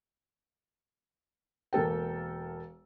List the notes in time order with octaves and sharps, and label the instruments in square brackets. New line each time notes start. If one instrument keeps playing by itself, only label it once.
[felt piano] E1 A#3 A4 G5